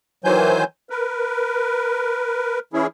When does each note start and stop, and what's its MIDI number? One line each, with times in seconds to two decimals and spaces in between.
0.24 0.64 51
0.24 0.64 52
0.24 0.64 54
0.24 0.64 72
0.24 0.64 80
0.24 0.64 91
0.90 2.59 70
0.90 2.59 71
2.73 2.87 52
2.73 2.87 61
2.73 2.87 64
2.73 2.87 68